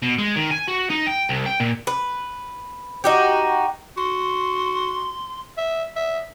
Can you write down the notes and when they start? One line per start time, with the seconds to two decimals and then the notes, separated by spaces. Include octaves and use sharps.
0.02 B2
0.18 G#3
0.36 D#3
0.51 G#5
0.68 F#4
0.90 D#4
1.07 G5
1.29 C2
1.46 G5
1.60 A#2
1.87 B4
3.04 D#4 F#4 G4
3.97 F#4 C6
5.58 E5
5.96 E5